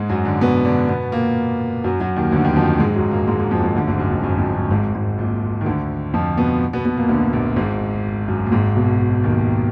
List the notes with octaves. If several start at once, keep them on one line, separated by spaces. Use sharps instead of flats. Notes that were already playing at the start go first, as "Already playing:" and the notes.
Already playing: G#2 G#3
F#2 F#3
D3 D4
B2 B3
D3 D4
B2 B3
A#2 A#3
F#2 F#3
F#2 F#3
D#2 D#3
D2 D3
D#2 D#3
F2 F3
G#2 G#3
F#2 F#3
A#2 A#3
G#2 G#3
G#2 G#3
F2 F3
F2 F3
D2 D3
G#1 G#2
F#2
F2
F#2
F2
F#2
G#1 G#2
G#1 G#2
A#1 A#2
D#3
D2 D3
F2 F3
B2 B3
B2 B3
B2 B3
A#2 A#3
D2 D3
A#1 A#2
G#1 G#2
F#2
A#2
G#1 G#2
B1 B2
D#2 D#3